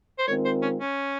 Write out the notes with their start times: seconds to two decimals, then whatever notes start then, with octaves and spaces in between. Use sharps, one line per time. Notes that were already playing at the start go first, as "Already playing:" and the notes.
0.19 C5
0.28 D#3 G#3 C4 F4 A#4 C#5
0.45 C5
0.62 C#4
0.80 C#4